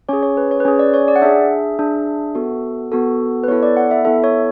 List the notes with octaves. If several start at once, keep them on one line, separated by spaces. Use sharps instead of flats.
C#4 G#4 C#5
C#5
B4
C#5
B4
C#4 G#4 C#5
D5
C#5
D5
F#5
D4 G#4 E5
D4 G#4
B3 F#4 A4
B3 F#4 A4
B4
B3 E4 A4 C#5
D5
F#5
E5
B3 E4 A4 E5
C#5